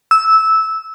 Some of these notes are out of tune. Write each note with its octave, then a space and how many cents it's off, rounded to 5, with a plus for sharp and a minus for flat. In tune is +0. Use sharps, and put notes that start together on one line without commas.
E6 -15